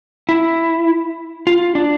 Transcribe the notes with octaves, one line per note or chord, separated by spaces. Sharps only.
E4
F4
D4